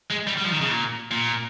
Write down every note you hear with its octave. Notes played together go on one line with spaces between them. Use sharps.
G#3
G3
G3
F3
D#3
C#3
A#2
A#2